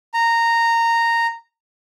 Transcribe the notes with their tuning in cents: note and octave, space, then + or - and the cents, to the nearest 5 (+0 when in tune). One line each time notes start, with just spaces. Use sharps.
A#5 -10